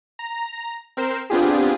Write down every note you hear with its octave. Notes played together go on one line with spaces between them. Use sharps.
A#5
C4 A#4 C5 C7 E7
B3 C4 D4 F4 G4 G#4